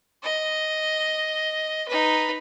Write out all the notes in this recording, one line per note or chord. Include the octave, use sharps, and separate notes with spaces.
D#5
D#4 B4